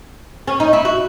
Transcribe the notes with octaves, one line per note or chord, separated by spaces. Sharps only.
C#4
D#4
E4
F#4